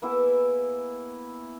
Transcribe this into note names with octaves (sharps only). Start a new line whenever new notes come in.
A#3 B3 E4 G#4